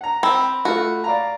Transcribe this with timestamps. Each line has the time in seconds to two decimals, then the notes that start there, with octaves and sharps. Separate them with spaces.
0.01 F#5 A#5
0.23 C4 B5
0.65 A3 F4 F#4
1.04 D5 F5 A#5